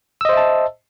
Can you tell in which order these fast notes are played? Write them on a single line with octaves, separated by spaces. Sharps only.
E6 D#5 C5 E5 A5